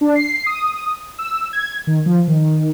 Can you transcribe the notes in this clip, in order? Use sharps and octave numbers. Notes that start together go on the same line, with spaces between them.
D4
C7
D#6
E6
G#6
D#3
F3
D#3